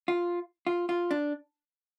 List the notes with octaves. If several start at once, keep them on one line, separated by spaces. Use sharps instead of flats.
F4
F4
F4
D4